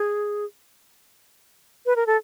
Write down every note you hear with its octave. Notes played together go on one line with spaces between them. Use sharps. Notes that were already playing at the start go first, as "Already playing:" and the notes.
Already playing: G#4
B4
A#4
A4